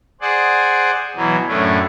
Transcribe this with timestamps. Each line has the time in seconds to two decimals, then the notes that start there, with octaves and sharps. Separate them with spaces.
0.21 G#4 C5 D5 F#5
1.16 B2 E3 F#3
1.48 F#2 A2 A3 C#4 D4